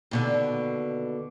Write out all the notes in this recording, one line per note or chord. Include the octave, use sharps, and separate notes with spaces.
D#2 B2 D3